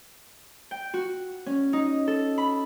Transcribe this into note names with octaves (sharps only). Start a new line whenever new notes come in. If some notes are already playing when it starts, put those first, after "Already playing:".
G5
F#4
C#4
D#4
A4
B5